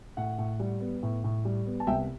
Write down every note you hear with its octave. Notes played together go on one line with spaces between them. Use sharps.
A2 F#5
A2
G3
B3
A2
A2
G3
B3
A5
C2 E5 G5